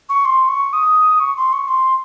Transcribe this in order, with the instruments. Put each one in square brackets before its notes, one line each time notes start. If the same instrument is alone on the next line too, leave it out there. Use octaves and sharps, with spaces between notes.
[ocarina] C#6
C6
C#6
D#6
C#6
C6
C#6
C6